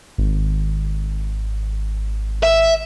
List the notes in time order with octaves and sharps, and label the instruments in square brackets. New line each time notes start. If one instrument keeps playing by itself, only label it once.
[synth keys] G#1
[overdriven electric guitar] E5